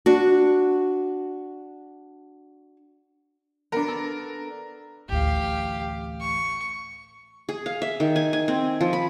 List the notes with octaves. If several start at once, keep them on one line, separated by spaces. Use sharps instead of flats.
D4 F#4
B3 D4 A#4
A4
A1 D2 G4 F5
C#6
G#4
F5
E5
D#3
G#5
G#5
C4
F3
B5